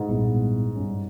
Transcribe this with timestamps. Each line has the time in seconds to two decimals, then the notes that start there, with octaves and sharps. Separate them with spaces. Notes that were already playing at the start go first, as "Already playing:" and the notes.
Already playing: G#2
0.08 B1 A#2 G3 B3 E4
0.76 G2 G3 C#4